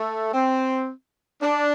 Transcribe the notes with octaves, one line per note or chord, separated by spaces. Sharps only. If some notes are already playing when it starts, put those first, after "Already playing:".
Already playing: A3
C4
D4